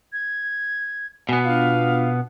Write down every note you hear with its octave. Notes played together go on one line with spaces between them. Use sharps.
G#6
B2 B3 F#4 G#5
D4 F4 F5